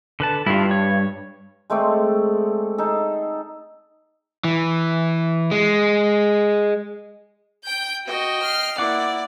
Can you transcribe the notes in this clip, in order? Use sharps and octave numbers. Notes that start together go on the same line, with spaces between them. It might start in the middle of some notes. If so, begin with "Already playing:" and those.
D3 B4 A5
G2 E4 F4
C#5
G#3 A3 C4 D5
D#4 G#4 A4
E3
G#3
G5 G6
F#4 D#5 G5
F6 C7
A#3 E4 D5 F#5 D6